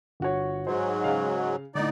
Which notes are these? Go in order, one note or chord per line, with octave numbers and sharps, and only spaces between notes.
G1 F#4 C#5
G#2 F#3 C5
C#3 F5
A2 D3 D#4 D5